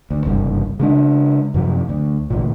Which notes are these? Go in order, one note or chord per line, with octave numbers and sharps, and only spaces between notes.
D2
F#1 C2 G2
C#3 G#3 D4
F#2 C3 F3 F#3
D2
A1 D2 A#2